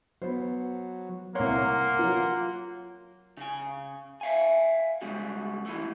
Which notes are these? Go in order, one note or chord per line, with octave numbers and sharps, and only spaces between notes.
F#3 B3 C5
C2 A#3 C#5 F#5 C6
F#3 F4
C#3 G#5
E5 F5 G#5
G#2 C#3 F#3 G3
D#2 E3 A3